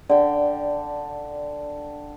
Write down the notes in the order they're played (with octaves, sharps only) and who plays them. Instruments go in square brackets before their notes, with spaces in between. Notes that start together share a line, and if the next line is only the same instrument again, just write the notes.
[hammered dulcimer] D3 G5 [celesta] D5